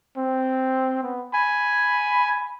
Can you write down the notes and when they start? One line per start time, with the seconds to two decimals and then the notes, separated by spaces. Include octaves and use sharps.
0.17 C4
1.03 B3
1.33 G#5 B5